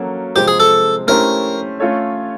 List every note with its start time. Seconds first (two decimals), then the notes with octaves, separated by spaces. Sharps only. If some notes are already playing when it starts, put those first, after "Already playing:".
Already playing: F#3 A#3 C#4 F#4 A4
0.36 C3 F3 G#3 C4 G4
0.48 G#4
0.60 A4
1.07 A3 C#4 E4 G4 A#4 C5
1.80 A3 C#4 F4 A4 C#5